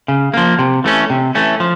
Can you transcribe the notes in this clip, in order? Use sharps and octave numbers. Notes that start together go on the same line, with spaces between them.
C#3
F3 A#3
C3
E3 A3 C#4
C3
E3 A3 C#4
F3